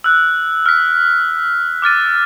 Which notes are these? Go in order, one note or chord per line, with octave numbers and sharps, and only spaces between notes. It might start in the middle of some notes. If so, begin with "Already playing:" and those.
E6 F#6
F6 B6
D6 F6 A6 D#7